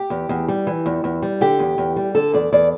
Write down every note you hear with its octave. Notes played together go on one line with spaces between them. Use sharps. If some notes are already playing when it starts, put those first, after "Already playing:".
Already playing: G4
E2
E2
G3
E3
E2
E2
G3
D3 G4
E2
E2
G3
D3 A4
E2 D5
E2 D5